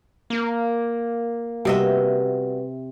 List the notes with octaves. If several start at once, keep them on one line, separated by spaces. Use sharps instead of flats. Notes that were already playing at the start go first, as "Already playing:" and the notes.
A#3
C3 G3 B3 F#4 D#5 E5